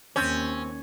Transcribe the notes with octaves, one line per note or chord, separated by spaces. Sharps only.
D#2 C4 C#4